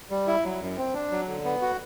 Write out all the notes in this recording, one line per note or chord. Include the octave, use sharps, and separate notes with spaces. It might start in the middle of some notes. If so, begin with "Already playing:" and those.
G3
E4
F#3
F#2
C4
D4
F#3
D3
B3
F#4